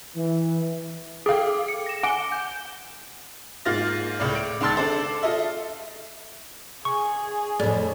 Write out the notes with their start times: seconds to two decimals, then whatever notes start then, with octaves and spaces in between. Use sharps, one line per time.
0.16 E3
1.26 G#4 A4 F5 G5 D6
1.68 C#7
1.86 A#6 E7
2.03 F#5 G#5 D6 D7 G7
2.32 G6
3.65 G#2 A#3 F4 F6 A6 A#6
4.19 C#2 A2 D5
4.35 D7
4.61 C#2 D#3 A5 C6 E6 A6
4.76 D4 A4 C5 D5
5.22 F4 A4 D#5 E5
6.85 G#4 C#6
7.60 F2 A2 D5